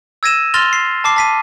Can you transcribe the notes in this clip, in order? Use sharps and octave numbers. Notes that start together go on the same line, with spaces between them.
E6 G#6 A#6 D#7 E7
C6 F6 A6 A#6 F7 G7
C7
A5 D6 C7
A5 B6 D#7